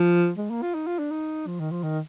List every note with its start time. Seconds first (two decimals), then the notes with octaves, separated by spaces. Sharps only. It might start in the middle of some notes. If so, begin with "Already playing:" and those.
Already playing: F3
0.38 G#3
0.50 A#3
0.62 F4
0.74 D#4
0.87 F4
0.99 D4
1.11 D#4
1.47 F3
1.59 D#3
1.71 F3
1.83 D#3